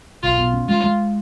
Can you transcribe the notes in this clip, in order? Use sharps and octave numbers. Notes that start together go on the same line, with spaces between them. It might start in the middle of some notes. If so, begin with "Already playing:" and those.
B1 F4
B2
C#4
G#3 F4
G#3